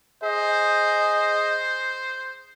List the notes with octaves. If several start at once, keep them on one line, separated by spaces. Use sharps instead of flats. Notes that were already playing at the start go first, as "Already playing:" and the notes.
G#4 C5 D#5